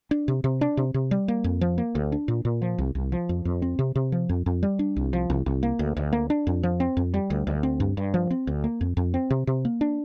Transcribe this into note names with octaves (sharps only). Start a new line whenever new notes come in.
D4
C3
C3
D4
C3
C3
G3
A#3
F2
F3
A#3
D2
D4
A#2
A#2
F3
C2
C2
F3
F2
F2
C4
C3
C3
F3
F2
F2
G3
D4
C2
F3
C2
C2
A#3
D2
D2
A#3
D4
F2
F3
C4
F2
G3
D2
D2
C4
G2
G2
F3
C4
D2
A#3
F2
F2
C4
C3
C3
A#3
D4